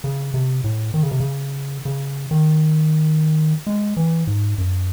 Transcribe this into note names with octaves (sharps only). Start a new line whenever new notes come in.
C#3
C3
A2
D#3
C#3
C3
C#3
C#3
D#3
G#3
E3
G#2
F#2